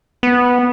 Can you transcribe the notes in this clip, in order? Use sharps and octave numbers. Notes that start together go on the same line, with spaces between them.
B3